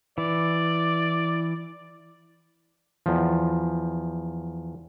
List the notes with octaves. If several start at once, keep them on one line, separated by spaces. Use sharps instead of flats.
E3 D5
E2 F3